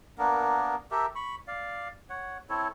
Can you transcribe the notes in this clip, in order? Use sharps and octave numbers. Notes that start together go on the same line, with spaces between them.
A#3 B3 D4 A#4
G4 A4 A#4 E5
B5 C#6
D5 F5
C#5 F#5
C4 E4 A4 C#5